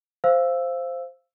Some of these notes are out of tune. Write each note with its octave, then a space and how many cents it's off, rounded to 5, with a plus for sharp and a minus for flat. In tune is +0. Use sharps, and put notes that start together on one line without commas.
C5 +0 F5 -15 E6 +0